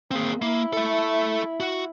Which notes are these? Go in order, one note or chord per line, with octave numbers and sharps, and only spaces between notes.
A#3 C4 G#4
A#3 E4
A4 E5
F#4 F#5